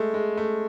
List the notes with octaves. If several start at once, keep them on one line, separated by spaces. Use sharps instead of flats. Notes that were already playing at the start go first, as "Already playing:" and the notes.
Already playing: G#3 A3
G#3
A3